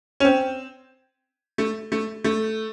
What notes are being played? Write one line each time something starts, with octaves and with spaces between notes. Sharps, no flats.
C#4
C4
A3
A3
A3